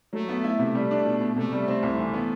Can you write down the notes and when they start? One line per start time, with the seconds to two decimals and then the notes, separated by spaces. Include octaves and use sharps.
0.13 F#3 A3
0.29 B3
0.44 E4
0.59 C3
0.75 G3
0.91 D4
1.06 B2
1.21 B2
1.36 C3 A3
1.52 G3
1.68 C4
1.83 C2
1.98 E3
2.14 B3